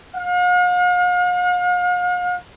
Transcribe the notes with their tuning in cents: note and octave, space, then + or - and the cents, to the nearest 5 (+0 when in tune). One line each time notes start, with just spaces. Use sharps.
F5 +45